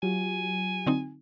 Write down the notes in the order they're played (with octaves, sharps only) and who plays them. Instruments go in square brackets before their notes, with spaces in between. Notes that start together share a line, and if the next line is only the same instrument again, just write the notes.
[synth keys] F#3 F4 G4 [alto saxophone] G#5
[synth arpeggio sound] D3 C4 D#4